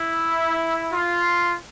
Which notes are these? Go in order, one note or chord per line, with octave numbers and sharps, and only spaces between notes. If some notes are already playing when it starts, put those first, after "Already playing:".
Already playing: E4
F4